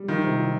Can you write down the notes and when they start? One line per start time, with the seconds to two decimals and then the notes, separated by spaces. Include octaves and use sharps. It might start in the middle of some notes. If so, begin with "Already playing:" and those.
Already playing: G3
0.08 D#3 F4
0.24 C3
0.38 F4